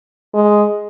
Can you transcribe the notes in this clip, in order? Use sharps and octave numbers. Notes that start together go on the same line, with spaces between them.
G#3